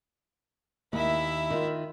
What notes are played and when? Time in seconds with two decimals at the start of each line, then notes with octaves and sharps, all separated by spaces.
0.93 D#2 E4 E5
1.50 D#3 F4